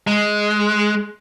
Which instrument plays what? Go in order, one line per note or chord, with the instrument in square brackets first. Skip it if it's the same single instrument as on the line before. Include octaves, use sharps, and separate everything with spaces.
[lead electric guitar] G#3